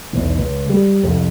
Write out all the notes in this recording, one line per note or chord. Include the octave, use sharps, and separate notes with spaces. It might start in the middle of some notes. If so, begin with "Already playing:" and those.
B1 E2
C#2
G3
C2 F2